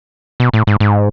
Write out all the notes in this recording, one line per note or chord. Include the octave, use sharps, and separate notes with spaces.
B2
A2
G#2
G#2